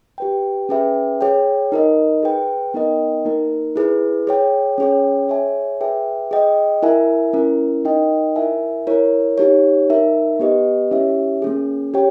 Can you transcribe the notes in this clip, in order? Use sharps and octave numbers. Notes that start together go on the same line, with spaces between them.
G4 B4 G5
C#4 G#4 B4 E5 G5
G#4 C#5 G5
D#4 A#4 D#5
G#4 B4 G5
B3 D#4 A#4 D#5 G5
A#3 D#4 A#4
E4 G#4 B4
G#4 C#5 G5
C#4 G#4 C#5 G5
G#4 C#5 E5 G#5
G#4 B4 E5 G5
G#4 D#5 G5
E4 A#4 E5 G#5
C#4 E4 A#4
D#4 A#4 D#5 G5
E4 A#4 E5 G#5
E4 A#4 C#5
D#4 G4 C#5
D#4 A#4 E5
B3 G4 B4 D#5
C#4 E4 G4 C#5 E5
A#3 C#4 G#4
G4 C#5 G5